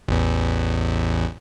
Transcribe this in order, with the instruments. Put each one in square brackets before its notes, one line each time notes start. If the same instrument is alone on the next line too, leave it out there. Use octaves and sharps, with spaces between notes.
[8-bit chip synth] A1 E2